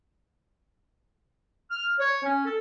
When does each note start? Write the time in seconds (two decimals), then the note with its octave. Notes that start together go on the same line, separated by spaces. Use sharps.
1.71 F6
2.00 C#5
2.23 C#4
2.46 A4